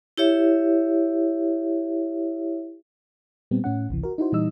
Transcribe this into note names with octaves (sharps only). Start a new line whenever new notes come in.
E4 G4 C#5 E5
A#2 G3 B3 C4
A2 C#4 F#5
G#1 C#2 C3 E3
F#4 A#4
D#4 E4 F#4 C5
A#2 E3 G3 D#4 D#5 E6